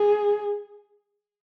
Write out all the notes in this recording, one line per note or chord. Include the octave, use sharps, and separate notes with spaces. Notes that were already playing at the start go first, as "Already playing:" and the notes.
Already playing: G#4